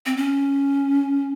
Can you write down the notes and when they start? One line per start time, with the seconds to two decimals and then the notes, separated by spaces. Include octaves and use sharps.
0.06 C4
0.17 C#4